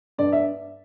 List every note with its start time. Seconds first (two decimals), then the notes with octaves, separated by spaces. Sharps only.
0.18 G2 D5
0.32 E5